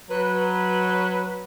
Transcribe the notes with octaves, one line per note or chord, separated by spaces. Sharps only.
F#3 B4